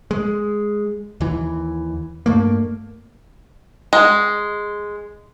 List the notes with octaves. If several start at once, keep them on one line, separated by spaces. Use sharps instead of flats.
G#3
D#2 E3
G2 A3 A#3
G#3